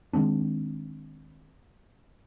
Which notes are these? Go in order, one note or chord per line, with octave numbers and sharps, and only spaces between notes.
D#3 G#3 C4 D4